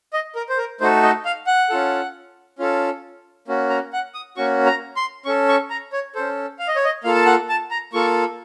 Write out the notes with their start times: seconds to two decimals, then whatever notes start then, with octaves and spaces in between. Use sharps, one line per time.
0.13 D#5
0.35 A#4
0.49 C5
0.58 A#4
0.80 A3 D#4 F#4 A4 C5
1.03 D#5
1.25 F5
1.47 F#5
1.70 C#4 F4 A4
2.59 C#4 F4 A4
3.48 A#3 C#4 F#4
3.70 A#5
3.93 F#5
4.14 D#6
4.37 A#3 C#4 F#4 C#6
4.66 A#5
4.96 C6
5.25 C#4 A4 C#6
5.49 C#6
5.70 A#5
5.93 C#5
6.15 C#4 A4 C5
6.59 F5
6.68 D#5
6.76 C#5
6.85 D#5
7.04 A#3 F4 A4 F5
7.15 A5
7.26 F#5
7.49 A5
7.71 A#5
7.93 A#3 F4 A4 C#6